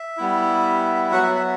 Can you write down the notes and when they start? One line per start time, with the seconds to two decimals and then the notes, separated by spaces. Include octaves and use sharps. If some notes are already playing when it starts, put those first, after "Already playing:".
Already playing: E5
0.17 G3 B3 E4
1.12 F#3 B3 F#4 F#5
1.23 E5
1.35 E5